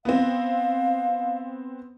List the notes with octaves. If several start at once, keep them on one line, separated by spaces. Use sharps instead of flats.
B3 C4 F5